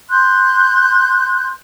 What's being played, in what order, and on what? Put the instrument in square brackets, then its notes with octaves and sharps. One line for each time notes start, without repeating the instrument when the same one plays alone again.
[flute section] C6 F#6 G6